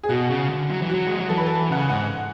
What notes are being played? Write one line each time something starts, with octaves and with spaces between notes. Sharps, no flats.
G#4
B2 F#4
C#3
D3
F#3
E3
F#3 F#4
G#3
F#3
E3 A4
B4
A4
C#3 F#5
G#5
G#2 F#5